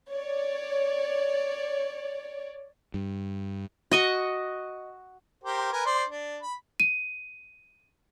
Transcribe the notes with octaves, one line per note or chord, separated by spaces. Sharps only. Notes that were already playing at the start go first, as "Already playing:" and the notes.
C#5 D5
G2
F#4 D#5 C#6
G4 A#4 C5
A#4 B4 G#5
C5 D5 C6
D4
B5
D#7